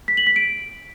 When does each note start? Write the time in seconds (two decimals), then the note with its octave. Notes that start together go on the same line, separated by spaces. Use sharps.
0.08 B6
0.17 F#7
0.27 B6
0.36 D7